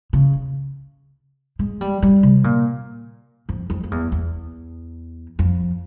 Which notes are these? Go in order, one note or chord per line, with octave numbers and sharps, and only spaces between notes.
C#3
G#3
G3
G3
C3
A#2
F2
F2
F2
E2
E2
F2